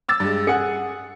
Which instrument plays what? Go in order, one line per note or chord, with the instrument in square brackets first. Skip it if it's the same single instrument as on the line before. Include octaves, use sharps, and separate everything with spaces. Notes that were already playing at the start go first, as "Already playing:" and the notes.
[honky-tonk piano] D6 E6 A6
G2 G#3
[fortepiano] G#4 F#5 [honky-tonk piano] C#7